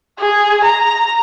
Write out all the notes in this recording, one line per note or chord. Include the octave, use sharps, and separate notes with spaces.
G#4
A#5